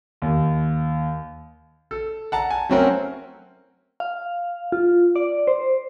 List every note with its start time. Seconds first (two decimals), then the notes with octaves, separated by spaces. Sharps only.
0.22 D#2
1.91 A4
2.32 F#5 A5 A#5
2.51 G#5
2.69 F#3 A3 C4 C#4 F#4 A#4
4.00 F5
4.72 F4
5.16 D5
5.47 C5